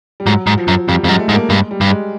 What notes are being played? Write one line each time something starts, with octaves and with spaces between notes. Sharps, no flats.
G3
G#2 F#3
G#2
F3
F#2
F2 G3
F2 G#3
F#2
A3
G#2
A#3
G2 G#3
G3
G2
G#3